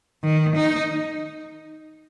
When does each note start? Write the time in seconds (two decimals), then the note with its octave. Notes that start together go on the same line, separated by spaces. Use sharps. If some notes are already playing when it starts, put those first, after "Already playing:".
0.23 D#3
0.56 D#4